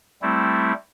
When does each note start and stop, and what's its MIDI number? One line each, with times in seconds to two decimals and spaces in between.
0.22 0.73 55
0.22 0.73 57
0.22 0.73 60
0.22 0.73 64